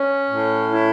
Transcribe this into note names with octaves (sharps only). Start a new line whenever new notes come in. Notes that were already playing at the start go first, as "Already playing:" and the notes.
Already playing: C#4
A2
E4